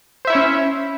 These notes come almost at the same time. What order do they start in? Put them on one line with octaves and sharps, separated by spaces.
C5 E5 E4 C#5 C#4